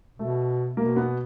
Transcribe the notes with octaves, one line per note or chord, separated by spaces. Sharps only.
B2 A3
B2 A#3
B3